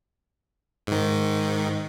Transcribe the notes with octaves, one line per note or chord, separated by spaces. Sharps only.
G#2 D#3